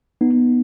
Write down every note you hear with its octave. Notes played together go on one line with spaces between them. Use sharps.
B3 D#4